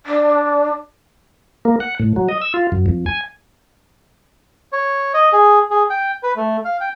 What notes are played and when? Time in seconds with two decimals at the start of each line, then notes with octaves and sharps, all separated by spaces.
0.06 D4
1.65 A#3
1.80 F#5
2.00 A2
2.16 F#3
2.29 D#5
2.42 E6
2.54 F4
2.72 F#2
2.86 F2
3.06 G#5
4.73 C#5
5.14 D#5
5.33 G#4
5.71 G#4
5.90 G5
6.23 B4
6.37 A3
6.65 F5
6.80 G5